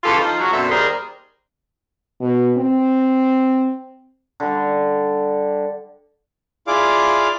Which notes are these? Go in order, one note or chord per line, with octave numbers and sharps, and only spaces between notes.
C#3 E3 F4 G4 A4
F3 D#4 F4
C#3 F#3 F#4
F#2 B2 D3 C4 A4 E5
D#2 G3 G#4 A#4 C5 D5
B2
C4
D3 G3
E4 F4 G#4 D5 F5 D6